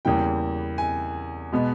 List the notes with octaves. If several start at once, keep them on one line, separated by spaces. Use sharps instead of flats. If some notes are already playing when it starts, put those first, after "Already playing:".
E2 C#3 E3 G3 A#3 G5
G#5
B2 G#3 B3